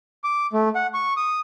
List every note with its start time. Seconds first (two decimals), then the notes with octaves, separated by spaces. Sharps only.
0.24 D6
0.53 A3
0.75 F#5
0.94 C#6
1.17 D#6